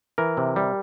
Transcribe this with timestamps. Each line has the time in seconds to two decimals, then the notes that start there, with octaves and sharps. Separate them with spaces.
0.18 E3 A#4
0.37 C3
0.56 G3